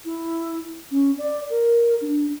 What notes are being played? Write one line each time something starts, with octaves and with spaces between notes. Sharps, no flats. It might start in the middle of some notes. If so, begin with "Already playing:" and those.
E4
C#4
D5
A#4
D4